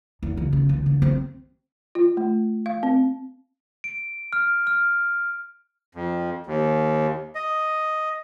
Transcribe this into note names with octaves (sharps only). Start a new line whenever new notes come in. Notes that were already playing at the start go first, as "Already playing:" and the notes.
E2
C#2
C#3
C#2
D3
C4
F4
A3
F5
C4
D7
F6
F6
F2
D#2
D#5